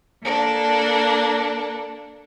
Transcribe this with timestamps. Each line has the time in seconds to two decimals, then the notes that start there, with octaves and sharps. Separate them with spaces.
0.23 A#3 D4 A4